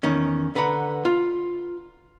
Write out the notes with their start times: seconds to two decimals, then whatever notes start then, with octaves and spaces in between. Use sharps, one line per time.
0.03 E2 D#3 C#4
0.55 D3 B4 F#5 A#5 B5
1.05 F4